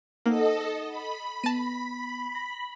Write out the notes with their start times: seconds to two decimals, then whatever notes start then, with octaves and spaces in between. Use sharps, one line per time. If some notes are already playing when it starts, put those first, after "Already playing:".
0.26 A#3 D#4 A4 C5 D#5 F#5
0.88 B5
1.44 B3 A5 A#6 B6 D#7
2.35 A#6